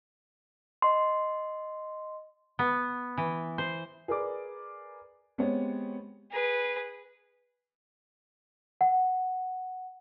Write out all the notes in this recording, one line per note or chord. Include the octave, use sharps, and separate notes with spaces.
D#5 C6
B3
E3
C5
G#4 A#4 B4 D5 D6
G#3 B3 C4 G4 C#5
G#4 B4
F#5